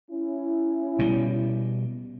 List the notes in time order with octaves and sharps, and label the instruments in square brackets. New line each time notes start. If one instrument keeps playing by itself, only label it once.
[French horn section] C#4 E4
[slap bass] B2 G3